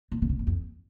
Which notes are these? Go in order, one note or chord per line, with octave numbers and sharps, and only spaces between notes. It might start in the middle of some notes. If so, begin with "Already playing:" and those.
A#2
C#3
C3
G2
F2